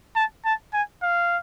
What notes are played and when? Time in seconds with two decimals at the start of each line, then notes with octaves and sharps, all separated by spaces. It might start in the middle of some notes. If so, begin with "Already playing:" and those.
0.16 A5
0.45 A5
0.73 G#5
1.03 F5